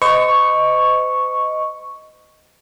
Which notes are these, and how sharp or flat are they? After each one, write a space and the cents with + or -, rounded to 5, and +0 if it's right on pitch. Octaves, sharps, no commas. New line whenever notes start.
C5 -45 D#5 +0 C#6 +0